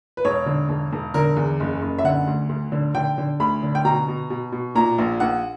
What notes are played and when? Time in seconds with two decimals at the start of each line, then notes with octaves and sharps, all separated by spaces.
0.17 B4
0.25 E1 C#5
0.46 D3
0.69 E1
0.92 E1
1.14 D3 A#4
1.36 E2
1.60 F#1
1.82 F#1
1.98 E5
2.04 D3 F#5
2.27 D2
2.49 D2
2.72 D3
2.95 D3 G5
3.18 D3
3.40 D2 B5
3.63 D3
3.75 G5
3.85 B2 A#5
4.08 B2
4.30 B2
4.52 B2
4.75 A#2 A#5
4.98 A#1
5.20 A#1 F#5